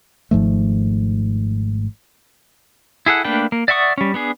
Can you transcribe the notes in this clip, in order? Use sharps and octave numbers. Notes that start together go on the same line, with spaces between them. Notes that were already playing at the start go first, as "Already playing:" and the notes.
G#1 G#2 F3 A3
E4 G#4 A4 F#5
A3 A#3 D4 B4 G5
A#3
D5 E5 F#5 C#6 D#6
G3 C#4
B3 D4 G#4